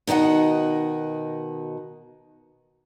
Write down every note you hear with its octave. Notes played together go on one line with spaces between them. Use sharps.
B2 D#3 F#4 D#5 F#5